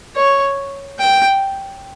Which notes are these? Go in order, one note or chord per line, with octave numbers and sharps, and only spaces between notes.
C#5
G5